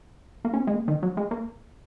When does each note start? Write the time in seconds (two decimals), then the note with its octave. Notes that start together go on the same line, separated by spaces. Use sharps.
0.45 A#3
0.54 C#4
0.59 C4
0.67 G#3
0.74 A#3
0.88 D#3
1.03 F#3
1.17 G#3
1.31 A#3